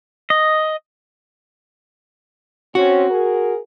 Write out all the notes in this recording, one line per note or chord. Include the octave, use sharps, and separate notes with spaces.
D#5
C4 C#4 F#4
G#4 A#4